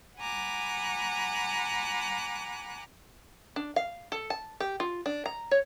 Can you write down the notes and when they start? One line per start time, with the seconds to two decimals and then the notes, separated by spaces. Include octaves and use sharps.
0.18 F#5 G#5 A#5 B5 D6 F#6
3.56 D4
3.76 F5
4.12 A4
4.30 A5
4.60 G4
4.80 F4
5.06 D4
5.26 A#5
5.51 C#5